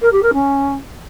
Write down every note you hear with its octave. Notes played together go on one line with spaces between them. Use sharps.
A#4
G4
A#4
C#4